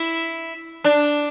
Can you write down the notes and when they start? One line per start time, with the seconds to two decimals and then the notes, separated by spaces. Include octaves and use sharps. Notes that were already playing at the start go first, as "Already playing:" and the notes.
Already playing: E4
0.84 D4